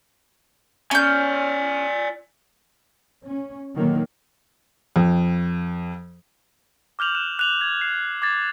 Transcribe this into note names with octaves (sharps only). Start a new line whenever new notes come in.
C#4 D5 G#5 G6
C#4
A#2 D3 D#3 F#3 A#3
F2
D6 F6 G6 F7 F#7
F#6 E7
F#6 F7 F#7
G#6
C7
D6 G#6 A6